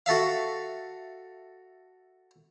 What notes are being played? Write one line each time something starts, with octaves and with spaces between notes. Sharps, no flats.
F#4 A4 E5 F5